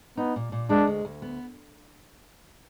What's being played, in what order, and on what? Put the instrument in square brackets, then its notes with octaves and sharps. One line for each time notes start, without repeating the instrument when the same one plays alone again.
[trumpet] B3 [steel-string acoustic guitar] D#4
[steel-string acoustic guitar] A#2
A#2
[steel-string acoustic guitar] G#3 [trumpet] D4
[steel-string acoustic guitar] D2
D2
B3